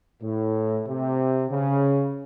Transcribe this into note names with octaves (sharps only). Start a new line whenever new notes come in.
A2
C3
C#3